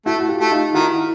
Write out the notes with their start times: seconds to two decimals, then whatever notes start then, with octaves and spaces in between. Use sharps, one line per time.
0.06 A3 E4 F#4
0.20 F#4
0.29 F4 G4
0.41 A3
0.51 D#4 F4
0.68 F4
0.74 D#3 E4 F#4